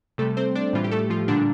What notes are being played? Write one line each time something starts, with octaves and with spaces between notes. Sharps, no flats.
C3 G3 A3 A4
C4 C5
D4 D5
A2 E3 G3 F4
G4
A3 A4
F3 F4
A#2 D3 G3 D4